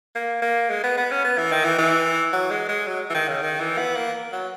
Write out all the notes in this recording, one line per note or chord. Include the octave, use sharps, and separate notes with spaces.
A#3
A#3
G#3
B3
B3
C#4
B3
E3
D#3
E3
E3
F#3
G#3
G#3
F#3
E3
D#3
C#3
D#3
E3
B3
A#3
F#3